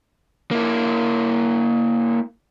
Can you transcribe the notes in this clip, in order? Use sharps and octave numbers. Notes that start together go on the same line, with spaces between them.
A#3 E4